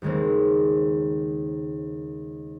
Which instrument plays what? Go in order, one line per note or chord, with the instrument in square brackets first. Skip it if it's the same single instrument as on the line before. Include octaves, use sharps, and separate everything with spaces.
[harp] D#2 C#3 G#3 A#3 C4